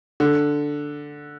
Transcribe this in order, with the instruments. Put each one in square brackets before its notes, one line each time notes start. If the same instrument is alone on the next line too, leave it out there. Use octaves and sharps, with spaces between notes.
[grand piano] D3